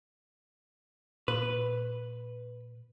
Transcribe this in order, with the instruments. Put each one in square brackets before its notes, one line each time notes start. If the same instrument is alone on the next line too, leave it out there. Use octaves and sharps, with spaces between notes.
[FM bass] A#2 [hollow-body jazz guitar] B4